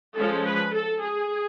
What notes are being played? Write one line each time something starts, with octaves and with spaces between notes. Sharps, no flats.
F3 G#3 C#4 A4
B4
A4
G#4